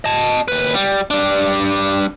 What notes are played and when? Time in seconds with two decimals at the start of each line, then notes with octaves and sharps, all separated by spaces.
0.05 D#5 A5
0.48 D#2 B4
0.74 G3
1.11 G3 D4